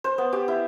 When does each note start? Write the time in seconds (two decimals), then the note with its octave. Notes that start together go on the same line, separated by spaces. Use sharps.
0.04 C5
0.18 B3
0.33 G4
0.48 E4